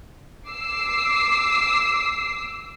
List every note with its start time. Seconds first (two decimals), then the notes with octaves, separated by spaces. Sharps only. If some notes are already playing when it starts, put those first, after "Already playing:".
0.49 D6 E6 C7